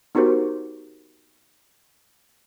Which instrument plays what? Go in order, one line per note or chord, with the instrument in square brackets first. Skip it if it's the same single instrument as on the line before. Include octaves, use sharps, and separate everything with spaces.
[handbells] B3 D#4 F#4 G4 A#4 C5